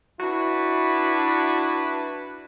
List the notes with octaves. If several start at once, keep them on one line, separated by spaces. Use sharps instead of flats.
D4 E4 F#4 B4